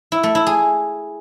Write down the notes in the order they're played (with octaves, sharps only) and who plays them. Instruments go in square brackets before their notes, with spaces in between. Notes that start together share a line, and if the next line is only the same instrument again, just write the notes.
[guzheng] E4
A3
E4
G#4